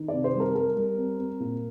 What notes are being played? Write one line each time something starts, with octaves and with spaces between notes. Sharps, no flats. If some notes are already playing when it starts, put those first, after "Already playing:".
Already playing: D#3
D5
C3
C5
G3 A#4
G3 A#4
G3
C4
C4
A#2